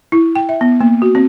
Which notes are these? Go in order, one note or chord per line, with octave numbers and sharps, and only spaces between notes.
E4
G5
E5
B3
A#3
F#4
C4